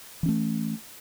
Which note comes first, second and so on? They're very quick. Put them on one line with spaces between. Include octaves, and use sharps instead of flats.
E3 C#4 A3